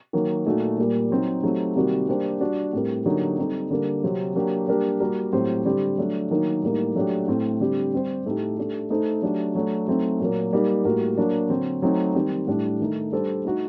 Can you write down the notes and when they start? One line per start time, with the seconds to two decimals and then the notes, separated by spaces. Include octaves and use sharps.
0.13 D#3 F#3 A#3
0.46 A#2 A3 D#4 F#4
0.78 A#2 G3 A#3
1.11 F#3 C4 D#4
1.43 F#3 A3 C4 D#4 G4
1.76 C3 D#3 G3 A#3 F#4
2.08 G3 A#3 D4 G4 C5
2.40 G3 D4 F#4
2.73 A2 G3 C4 G4 A#4
3.06 D3 F#3 A#3 D#4 G4
3.38 G3 C4 D#4 A4
3.71 D3 G3 A#3
4.03 C3 F#3 C4 G4
4.35 F#3 A#3 D4 G4
4.68 G3 A#3 D4 G4 A#4
5.00 G3 A#3 F#4 A#4
5.33 A2 F#3 C4 G4 C5
5.65 D3 G3 C4 G4
5.98 F#3 A3 D4
6.31 D#3 F#3 A#3 D#4
6.62 A2 G3 A#3 D#4
6.96 F#3 A3 D4 G4
7.28 A2 A3 C4
7.60 D3 G3 C4 G4
7.93 G3 C4 G4 C5
8.25 A2 A3 D#4 G4
8.57 A3 D4 G4
8.90 A3 D#4 A4 C5
9.22 F#3 A3 D4 G4
9.55 F#3 A3 D4
9.87 F#3 A3 C4 D#4
10.20 A#2 F#3 A#3
10.53 G3 A#3 D#4
10.85 A2 G3 A#3 F#4 A#4
11.18 F#3 A#3 D4
11.50 D3 F#3 C4
11.82 F#3 A3 C4 D#4
12.15 D#3 G3 C4
12.48 A2 G3 D4
12.80 D#3 A3 D#4
13.12 G3 D4 A4 C5
13.45 A3 D#4 F#4